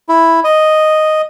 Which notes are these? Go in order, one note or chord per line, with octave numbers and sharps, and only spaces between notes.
E4
D#5